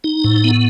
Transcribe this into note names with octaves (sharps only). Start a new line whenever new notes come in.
D#4
A2
B3